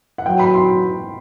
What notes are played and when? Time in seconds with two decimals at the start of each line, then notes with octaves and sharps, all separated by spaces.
0.18 F#5
0.26 F#3 G5
0.39 B5
0.54 C6